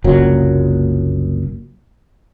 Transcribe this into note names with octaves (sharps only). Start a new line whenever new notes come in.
F#1 C2 A#2 F#3